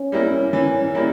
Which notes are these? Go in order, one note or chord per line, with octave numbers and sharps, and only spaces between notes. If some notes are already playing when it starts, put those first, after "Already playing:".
Already playing: C#4
G3 A#3 E4
E3
G3 A#3 E4